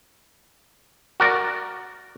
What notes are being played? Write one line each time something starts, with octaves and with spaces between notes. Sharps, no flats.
F#4 A#4 D5